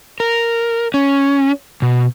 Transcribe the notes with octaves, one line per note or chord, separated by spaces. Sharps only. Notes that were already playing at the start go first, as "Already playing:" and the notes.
A#4
C#4
B2